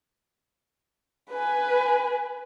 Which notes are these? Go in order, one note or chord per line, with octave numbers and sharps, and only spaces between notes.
B4 G#5